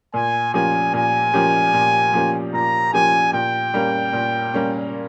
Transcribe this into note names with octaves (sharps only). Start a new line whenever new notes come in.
A#2 G#5
F3 A#3 C#4 G4 G#5
A#2 G#5
F3 A#3 C#4 G4
A#2
F3 A#3 C#4 G4
A#2 A#5
F3 A#3 C#4 G4 G#5
A#2 G5
G3 A#3 C#4
A#2
G3 A#3 C#4